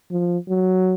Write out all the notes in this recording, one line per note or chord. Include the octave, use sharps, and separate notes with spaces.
F3
F#3